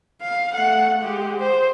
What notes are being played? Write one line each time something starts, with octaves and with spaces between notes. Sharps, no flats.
F5
A3 F#5
G#3 G4
C5